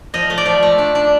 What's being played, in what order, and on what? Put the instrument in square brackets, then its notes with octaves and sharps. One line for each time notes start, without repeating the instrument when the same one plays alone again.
[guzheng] F3 D#5
A3
D5
F3
A3
D4
D4